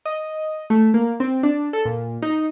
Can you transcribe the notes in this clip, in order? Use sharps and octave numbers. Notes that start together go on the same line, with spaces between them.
D#5
A3
A#3
C4
D4
A4
A#2
D#4